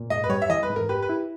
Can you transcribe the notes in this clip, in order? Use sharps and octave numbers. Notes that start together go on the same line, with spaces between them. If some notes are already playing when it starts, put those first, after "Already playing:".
Already playing: A#2
G#2 D#5
B4
G3 C#5
E5
E3 D#5
B4
G#2
A#4
G4 B4
B4
E4